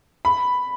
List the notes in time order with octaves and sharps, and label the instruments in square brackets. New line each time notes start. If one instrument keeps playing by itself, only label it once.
[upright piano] B5